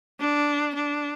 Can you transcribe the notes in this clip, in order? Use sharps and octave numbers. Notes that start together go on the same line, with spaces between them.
D4
D4